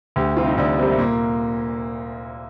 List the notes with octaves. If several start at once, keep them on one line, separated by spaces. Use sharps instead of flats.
D2 G4
C3 G3 C4 F4
D#4
D2 D4
C3 G3 A#3 C4
A#2 A#3